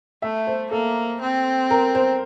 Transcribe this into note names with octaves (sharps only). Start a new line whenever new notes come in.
A3 E5
C5
A#3 A4
C4
A#4
C5